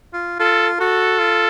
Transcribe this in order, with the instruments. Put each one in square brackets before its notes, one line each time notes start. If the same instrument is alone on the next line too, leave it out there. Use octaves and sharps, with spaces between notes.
[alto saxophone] F4
[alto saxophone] F4 [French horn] A4
[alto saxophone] F#4 [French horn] A4
[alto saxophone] F4